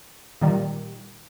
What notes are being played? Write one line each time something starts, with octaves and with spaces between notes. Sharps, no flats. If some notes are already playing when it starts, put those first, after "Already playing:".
A#2 D#3 G3